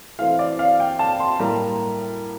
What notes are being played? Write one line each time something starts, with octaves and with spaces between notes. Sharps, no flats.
E3 A3 C4 F5
D5
F5
G5
A5
C6
A2 G3 A#3 A#5